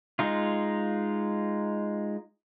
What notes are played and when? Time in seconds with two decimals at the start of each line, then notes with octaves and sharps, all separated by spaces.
0.19 G#3 D#4 F4